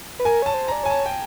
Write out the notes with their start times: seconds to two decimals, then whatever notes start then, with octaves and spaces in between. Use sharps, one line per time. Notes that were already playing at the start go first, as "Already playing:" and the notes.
0.19 B4
0.25 A#4 G#5
0.42 C#5 A5
0.54 C5
0.68 D5 A#5
0.83 C#5 G#5
0.90 A5
1.06 G5